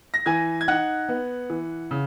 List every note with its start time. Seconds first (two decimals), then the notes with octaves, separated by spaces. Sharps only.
0.14 A#6
0.26 E3 G#5 G#6
0.61 G#6
0.68 D#4 F#5 F#6
1.09 B3
1.50 E3
1.91 C#3